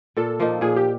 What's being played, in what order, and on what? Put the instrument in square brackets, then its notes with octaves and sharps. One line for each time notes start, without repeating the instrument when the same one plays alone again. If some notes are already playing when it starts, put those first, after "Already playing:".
[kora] A#2 [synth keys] A4
[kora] F3 A#3 D#4
[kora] A#2 [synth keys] G#4
[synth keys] G4